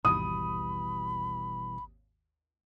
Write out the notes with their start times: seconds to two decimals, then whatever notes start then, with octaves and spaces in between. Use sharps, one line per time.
0.05 G#1 D#2 B2 E3 G3 B5 D#6